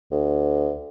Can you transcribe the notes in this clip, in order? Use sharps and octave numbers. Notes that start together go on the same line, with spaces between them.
D2